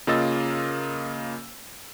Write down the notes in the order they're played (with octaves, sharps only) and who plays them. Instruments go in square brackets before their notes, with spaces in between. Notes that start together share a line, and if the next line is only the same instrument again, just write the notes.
[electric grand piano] C#3 A#3 F4 D#5 E6 A6